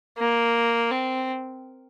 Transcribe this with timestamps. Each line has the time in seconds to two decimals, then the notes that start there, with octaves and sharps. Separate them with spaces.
0.18 A#3
0.91 C4